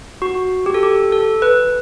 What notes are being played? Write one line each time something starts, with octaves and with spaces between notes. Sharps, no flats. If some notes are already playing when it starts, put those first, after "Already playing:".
F#4
G4
A4
G4
A4
B4